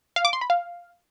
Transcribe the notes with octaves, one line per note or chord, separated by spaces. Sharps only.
F5
D6
C6
B5
F5